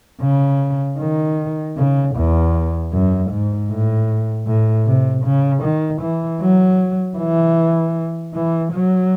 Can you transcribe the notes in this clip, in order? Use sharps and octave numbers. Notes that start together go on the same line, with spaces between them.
C#3
D#3
C#3
E2
F#2
G#2
A2
A2
C3
C#3
D#3
E3
F#3
E3
E3
F#3